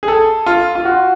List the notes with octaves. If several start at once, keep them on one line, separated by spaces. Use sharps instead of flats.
G#4
A4
F4
F4
F#4